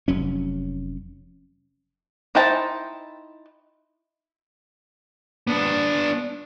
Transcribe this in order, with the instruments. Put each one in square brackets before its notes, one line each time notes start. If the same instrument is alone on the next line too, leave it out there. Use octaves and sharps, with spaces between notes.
[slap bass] F1 F#3 C#4
[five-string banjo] D#4 E4 C5 G5 A5
[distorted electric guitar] B3 D4